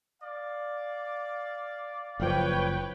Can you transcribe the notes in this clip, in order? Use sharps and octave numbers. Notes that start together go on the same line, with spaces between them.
D5 F5
F#1 F3 B4 C#5 G5